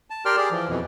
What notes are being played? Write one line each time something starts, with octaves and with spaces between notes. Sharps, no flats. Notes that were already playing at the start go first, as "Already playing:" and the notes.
A5
G4 A#4 D5 G5 C6 F6
G4 G#4 D5
E3 F3
F2 B2 E3